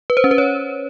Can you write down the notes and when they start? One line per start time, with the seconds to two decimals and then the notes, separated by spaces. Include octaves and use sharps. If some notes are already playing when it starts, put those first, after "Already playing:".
0.10 B4
0.17 C5
0.24 C#4
0.31 B4
0.38 C#5